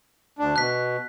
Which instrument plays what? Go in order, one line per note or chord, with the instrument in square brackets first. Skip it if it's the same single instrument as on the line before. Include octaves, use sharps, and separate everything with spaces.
[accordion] D2 D4
[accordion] B2 [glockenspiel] F#6 B6